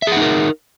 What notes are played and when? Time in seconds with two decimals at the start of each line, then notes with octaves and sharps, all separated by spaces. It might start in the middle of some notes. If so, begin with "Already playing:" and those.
0.02 E5
0.07 G#4
0.12 F#5
0.17 D#4
0.22 A#4